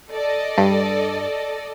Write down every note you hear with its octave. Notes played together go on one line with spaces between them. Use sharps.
A4 D5 D#5
G2